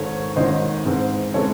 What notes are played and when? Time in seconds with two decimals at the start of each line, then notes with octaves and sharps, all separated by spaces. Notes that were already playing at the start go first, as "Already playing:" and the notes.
Already playing: G#1 G#2 D#3 A4 C#5
0.36 G#1 G#2 D#3 C5 D#5
0.85 G#2 E3 G#3 C4
1.34 E3 G#3 C4 A4 C#5